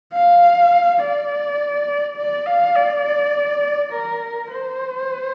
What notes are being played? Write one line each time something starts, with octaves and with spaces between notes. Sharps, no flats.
F5
D5
D5
F5
D5
A#4
C5